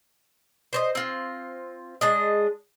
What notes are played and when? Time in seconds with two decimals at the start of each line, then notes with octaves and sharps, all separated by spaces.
0.73 C5 C#5 D#5
0.95 C4 F4
2.01 G#3 D4 D#5